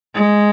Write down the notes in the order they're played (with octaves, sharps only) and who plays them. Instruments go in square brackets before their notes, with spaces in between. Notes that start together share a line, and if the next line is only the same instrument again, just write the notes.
[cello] G#3